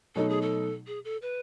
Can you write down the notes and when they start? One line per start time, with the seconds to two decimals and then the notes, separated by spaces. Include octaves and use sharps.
0.16 B2 F#3 A3 D#4 A4
0.30 G#4
0.42 A4
0.87 G#4
1.05 A4
1.22 B4